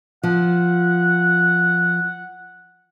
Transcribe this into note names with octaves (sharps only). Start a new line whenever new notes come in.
F3 F#5